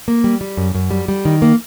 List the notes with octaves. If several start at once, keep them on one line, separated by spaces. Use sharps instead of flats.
A#3
G3
G3
F#2
F#2
G3
G3
D#3
A#3